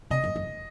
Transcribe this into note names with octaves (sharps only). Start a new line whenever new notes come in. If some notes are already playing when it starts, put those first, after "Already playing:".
C3 D#5
F#2
F#2